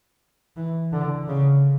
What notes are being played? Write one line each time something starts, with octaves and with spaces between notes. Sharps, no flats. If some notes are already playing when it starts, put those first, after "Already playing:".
E3
D3
C#3